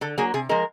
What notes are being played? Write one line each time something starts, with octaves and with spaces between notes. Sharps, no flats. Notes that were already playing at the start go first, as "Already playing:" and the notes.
D3 A4
F#3 A#3 G#4
C3 G#4
F3 G#3 A#4